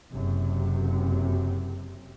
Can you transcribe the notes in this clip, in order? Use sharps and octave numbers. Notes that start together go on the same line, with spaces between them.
F#1 F#2 C3